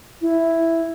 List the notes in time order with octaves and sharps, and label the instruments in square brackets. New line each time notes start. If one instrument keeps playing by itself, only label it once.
[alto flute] E4